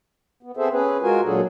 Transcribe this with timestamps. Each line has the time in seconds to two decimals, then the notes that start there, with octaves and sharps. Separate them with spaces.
0.43 B3
0.57 B3 C4 G#4 A4 C5 E5
0.72 C#4 G#4 B4
1.02 G#3 F4 F#4 A#4 G#5
1.24 A#2 F#3 D4 G#4 A4